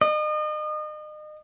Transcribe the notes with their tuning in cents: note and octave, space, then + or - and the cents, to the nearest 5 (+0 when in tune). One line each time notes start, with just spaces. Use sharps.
D#5 -35